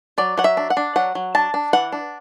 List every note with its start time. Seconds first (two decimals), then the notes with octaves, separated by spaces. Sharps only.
0.18 F#3 D5
0.38 F#3 F#5
0.44 E5
0.57 D4
0.70 F#5
0.77 D4
0.96 F#3 F#5
1.15 F#3
1.35 D4 A5
1.54 D4
1.73 E3 F#5
1.92 D4